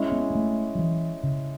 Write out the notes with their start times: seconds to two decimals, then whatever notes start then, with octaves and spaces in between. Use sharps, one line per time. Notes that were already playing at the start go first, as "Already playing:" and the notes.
Already playing: G#3 C#4 E4
0.12 B3
0.30 B3
0.35 A3
0.75 F#3
0.79 E3
1.23 C#3